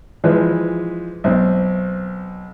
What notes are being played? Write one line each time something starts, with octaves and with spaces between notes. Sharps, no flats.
E3 F3 G#3 B4
B1 C4